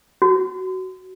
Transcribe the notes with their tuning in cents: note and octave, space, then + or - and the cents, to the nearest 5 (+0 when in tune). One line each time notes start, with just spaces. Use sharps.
F#4 +10